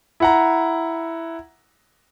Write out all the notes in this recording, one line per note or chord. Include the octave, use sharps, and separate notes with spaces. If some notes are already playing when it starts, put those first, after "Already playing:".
E4 F#5 A#5